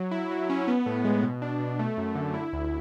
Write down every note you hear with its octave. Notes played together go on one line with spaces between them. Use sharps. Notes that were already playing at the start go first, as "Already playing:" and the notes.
Already playing: F#3
E4
F#3
C#4
B3
A2
G#3
B2
D4
B2
A3
F#2
D3
E4
D2